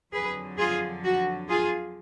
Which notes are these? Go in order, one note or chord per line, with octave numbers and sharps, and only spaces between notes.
F2 D3 F#3 G#4 B4
F4 G#4
F#4
F4 G#4